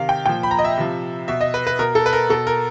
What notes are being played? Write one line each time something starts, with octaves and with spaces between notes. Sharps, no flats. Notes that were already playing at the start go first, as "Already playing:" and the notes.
Already playing: C3 D#3 F5
G5
A#2 F3 G5
B5
A#5
D#5
E5
C3 F3
B2 E5
D#5
B4
B4
B2 A#4
A4
B4
A#4
B2 A4
A#4